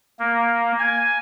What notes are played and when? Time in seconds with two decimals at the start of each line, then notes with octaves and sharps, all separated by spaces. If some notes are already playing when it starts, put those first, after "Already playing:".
0.19 A#3
0.79 G#5